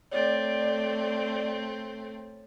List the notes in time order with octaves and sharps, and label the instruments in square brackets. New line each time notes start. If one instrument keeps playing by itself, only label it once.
[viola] A3 C4 [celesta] C#5 A6 [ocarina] D5